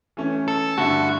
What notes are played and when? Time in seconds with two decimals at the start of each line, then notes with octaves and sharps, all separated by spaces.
0.17 E3 A3 C#4
0.48 A4
0.77 G2 D3 A3 E4 F#4